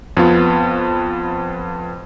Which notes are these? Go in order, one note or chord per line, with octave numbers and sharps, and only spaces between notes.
F2 B3 F4